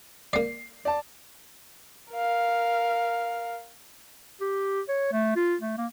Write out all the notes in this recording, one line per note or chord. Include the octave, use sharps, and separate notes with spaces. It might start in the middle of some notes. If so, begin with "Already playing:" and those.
A#3 D5 C7
D5 A5
A#4 F5
G4
C#5
A3
F4
A3
A#3